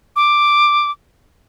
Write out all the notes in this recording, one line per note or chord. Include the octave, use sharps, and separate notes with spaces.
D6